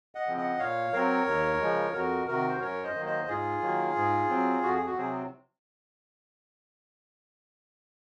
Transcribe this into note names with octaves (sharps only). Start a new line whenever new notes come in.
D#5 F#5
C#3 F3 C4
D#5 F#5
A#2 C#5 F5
F#3 C4 A#4 C#5
D#2
C#3 F3 G#3
F2 F#4 A#4
C3 D#3 F#4 A#4
C5
F#2 A#4 C#5
C5 D#5
D#3 F#3 A#3
C5 D#5
G#2 F4 G#4
D#3 F#3 A#3
G#2
F#3 C4
F2 F#4
G#4
F#4
C3 F#3 C4 G#4